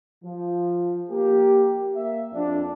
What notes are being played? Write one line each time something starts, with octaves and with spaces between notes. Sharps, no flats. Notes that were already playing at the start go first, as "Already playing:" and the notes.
F3
A#3 G4
A#3 E5
F2 D4